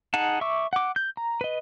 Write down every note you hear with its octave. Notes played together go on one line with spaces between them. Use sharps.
D#4 G#4 F#5 A5
E5 C#6 D6 E6
F#5 D6
G6
A#5
B4 D#5